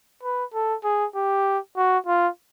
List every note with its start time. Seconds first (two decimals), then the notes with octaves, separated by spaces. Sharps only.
0.23 B4
0.54 A4
0.84 G#4
1.15 G4
1.77 F#4
2.07 F4